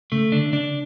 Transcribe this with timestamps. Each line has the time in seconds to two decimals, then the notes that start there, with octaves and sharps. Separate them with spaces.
0.12 C#3 A3
0.32 D3 D4
0.53 C#3 D4